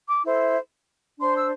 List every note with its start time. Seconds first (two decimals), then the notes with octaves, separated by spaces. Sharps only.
0.08 D6
0.23 E4 A4 C5
1.18 D4 C5 C6
1.35 E6